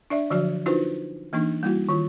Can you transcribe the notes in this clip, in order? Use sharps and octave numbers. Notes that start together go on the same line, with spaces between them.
D4 D5 E5
D3 F3 F#3 F#4 D5
D4 D#4 F4 F#4 B4 C5
E3 A#3 D4 D#4
G3 A#3 E4 F#4
D#3 F4